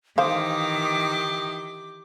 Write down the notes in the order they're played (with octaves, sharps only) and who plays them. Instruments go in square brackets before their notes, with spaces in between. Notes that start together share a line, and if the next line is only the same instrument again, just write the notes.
[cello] D#3 E3 [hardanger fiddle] G4 D6 [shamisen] C5 F5 [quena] D#6